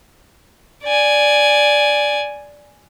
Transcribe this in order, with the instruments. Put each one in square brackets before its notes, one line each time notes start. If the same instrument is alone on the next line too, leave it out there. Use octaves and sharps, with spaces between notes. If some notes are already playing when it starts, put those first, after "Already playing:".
[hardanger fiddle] D5 G#5